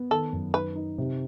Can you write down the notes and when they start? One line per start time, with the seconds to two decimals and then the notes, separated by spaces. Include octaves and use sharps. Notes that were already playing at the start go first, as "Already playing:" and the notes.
Already playing: B3
0.11 D#3 A4
0.32 F#2
0.54 D#4 B4
0.75 D#4
0.98 C3